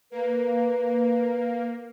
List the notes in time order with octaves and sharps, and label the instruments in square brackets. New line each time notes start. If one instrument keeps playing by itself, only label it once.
[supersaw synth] A#3 [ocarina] B4